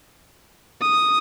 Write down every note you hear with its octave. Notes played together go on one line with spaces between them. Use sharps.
D#6